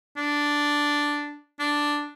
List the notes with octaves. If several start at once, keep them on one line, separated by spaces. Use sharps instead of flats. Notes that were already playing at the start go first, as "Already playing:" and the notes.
D4
D4